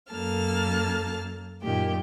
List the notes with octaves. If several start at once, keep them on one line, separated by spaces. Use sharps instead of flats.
F#2 A#3 A4 A5 F6
F#2 A#2 D#3 G4